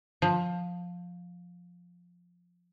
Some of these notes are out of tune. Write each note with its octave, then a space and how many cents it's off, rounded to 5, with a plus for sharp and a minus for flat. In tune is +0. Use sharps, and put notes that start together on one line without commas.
F3 +15